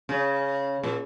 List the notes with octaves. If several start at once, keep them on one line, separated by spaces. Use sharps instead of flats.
C#3
A#2